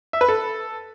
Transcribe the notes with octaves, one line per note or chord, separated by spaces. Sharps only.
E5
B4
A4